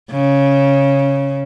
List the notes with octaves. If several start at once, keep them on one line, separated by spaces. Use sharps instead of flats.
C#3